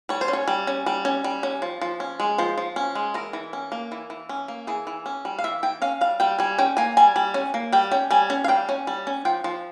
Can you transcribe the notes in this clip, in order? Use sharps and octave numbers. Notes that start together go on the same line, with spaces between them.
G3 C#5
C5
C#4
C#5
G3
C#4
G3
C#4
G3
C#4
F3
F3
C#4
G#3
F3 C5
F3
C#4
G#3
E3 A#4
E3
C#4
A#3
E3
E3
C#4
A#3
E3 G#4
E3
C#4
G3
F5
E3 E5
E3 G5
C#4 F5
G3 F5
G3 G5
G3 G#5
C#4 G5
A#3 G#5
G3 G#5
G3
C#4
A#3
G3 G5
C#4 G5
G3 G#5
C#4
F5
G3 G5
C#4
G3
C#4
F3 G5
F3